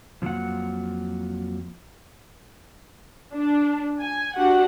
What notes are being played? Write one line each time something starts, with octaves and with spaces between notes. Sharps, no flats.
F2 C#3 F3 F#3 A#3 F#5
D4
G#5
D4 F#4 G4 F#5